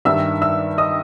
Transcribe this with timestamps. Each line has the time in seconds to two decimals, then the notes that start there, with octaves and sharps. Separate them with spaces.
0.05 G2 D#3 G3 E5 E6
0.41 E5 E6
0.78 D#5 D#6